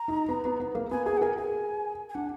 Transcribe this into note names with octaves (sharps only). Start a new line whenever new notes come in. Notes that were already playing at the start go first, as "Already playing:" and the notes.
Already playing: A#5
D#4
B3
B3
B3
A#3
B3 G#5
G#4 G#5
F#5
A#4 G#5
G#4 G#5
G#5
D4 F#5